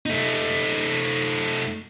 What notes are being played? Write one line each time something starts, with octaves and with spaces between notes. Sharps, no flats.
A3 D#4